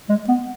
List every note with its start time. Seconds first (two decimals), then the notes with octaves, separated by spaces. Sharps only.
0.09 G#3
0.29 B3